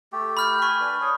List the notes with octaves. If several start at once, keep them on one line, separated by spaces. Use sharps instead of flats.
A3 G4
B5 F6 G6
G#5 C#6 B6
D4 B4
G#4 C#5